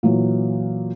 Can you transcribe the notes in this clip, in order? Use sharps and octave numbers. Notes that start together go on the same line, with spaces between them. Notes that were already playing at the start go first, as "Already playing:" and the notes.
A#2 E3 F#3